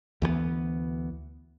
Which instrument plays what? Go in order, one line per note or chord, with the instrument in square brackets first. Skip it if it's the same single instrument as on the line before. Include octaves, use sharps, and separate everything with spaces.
[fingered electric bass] D2 E3 F#3 B3